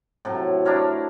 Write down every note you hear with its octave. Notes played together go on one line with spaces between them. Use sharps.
A2 C3 F#3
D4 E4 A#4 C#5